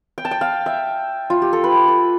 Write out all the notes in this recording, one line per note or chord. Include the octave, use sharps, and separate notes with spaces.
G5
A5
G5
F5
E5
F4
G4
A4
B4
A4